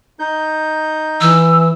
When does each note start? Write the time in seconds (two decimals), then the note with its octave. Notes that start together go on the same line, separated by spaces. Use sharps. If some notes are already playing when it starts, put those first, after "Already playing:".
0.19 D#4 G6
1.21 E3 E6